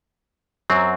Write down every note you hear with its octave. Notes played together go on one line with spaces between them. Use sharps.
F#2 F#3 C4